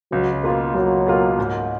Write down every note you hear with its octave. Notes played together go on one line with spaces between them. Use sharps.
C#2 F#3
B2 A#3 F4
C#2 F#3
B2 A#3 F4
G#2